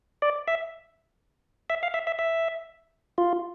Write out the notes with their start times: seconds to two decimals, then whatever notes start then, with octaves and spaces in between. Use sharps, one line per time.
0.22 D5
0.48 E5
1.70 E5
1.83 F5
1.94 E5
2.07 E5
2.19 E5
3.18 F4